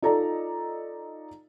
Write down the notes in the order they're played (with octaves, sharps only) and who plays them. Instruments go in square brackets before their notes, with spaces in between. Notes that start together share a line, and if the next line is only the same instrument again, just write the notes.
[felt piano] D#4 F4 A4 D5 A#5